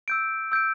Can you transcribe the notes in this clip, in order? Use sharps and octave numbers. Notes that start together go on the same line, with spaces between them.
E6 G6 D7
E6 G6 D7